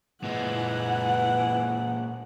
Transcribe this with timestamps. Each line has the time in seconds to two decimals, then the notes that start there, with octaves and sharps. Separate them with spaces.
0.24 A#2 E3 G#3 F#5